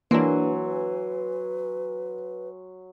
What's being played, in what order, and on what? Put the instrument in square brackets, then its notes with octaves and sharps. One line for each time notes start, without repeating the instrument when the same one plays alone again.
[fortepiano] E3 [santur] F#3 G#5 C6 [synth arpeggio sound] A#3 D4 [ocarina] B4